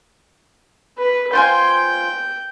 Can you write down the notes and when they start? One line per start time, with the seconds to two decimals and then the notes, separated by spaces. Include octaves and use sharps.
0.98 B4
1.33 F4 C5 G5 G#5